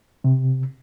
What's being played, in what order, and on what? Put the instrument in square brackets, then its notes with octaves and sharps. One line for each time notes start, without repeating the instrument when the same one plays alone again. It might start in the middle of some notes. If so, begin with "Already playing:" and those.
[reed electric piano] C3